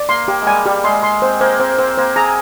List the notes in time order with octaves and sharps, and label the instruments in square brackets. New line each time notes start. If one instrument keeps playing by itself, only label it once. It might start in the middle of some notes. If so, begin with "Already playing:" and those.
Already playing: [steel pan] D5
[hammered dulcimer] A#3 [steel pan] C6
[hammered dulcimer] A#3 [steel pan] G4
[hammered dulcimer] G#3
[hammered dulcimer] G3 [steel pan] G#5
[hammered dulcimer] G3 [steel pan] G4
[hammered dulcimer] G#3 [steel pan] C6
[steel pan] C6
[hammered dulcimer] C4 [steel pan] C5
[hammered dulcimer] A#3 [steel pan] C5
[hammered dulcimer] C4 [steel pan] C5
[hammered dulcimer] C4 [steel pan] C5
[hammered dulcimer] A#3 [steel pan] C5
[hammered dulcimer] G#4 [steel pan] A#5